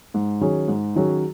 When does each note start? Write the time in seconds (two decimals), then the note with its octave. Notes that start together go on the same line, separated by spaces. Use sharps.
0.14 G#2
0.41 D#3 F#3 C#4 G#4
0.68 G#2
0.96 D#3 F#3 C#4 G#4